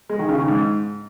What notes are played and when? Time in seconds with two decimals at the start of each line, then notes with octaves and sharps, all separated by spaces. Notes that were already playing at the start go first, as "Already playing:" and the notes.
0.10 G#3
0.19 D#3
0.29 C#3
0.38 D#3
0.48 G#2